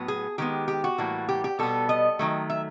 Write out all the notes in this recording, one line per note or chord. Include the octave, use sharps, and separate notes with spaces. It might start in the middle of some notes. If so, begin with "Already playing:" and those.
Already playing: A2 F#3 B3
G#4
D#3 G#3 B3 G4
G4
F#4
A2 E3 G3 A#3
G4
G4
B2 G3 B3 A4
D#5
D#3 F#3 A3
E5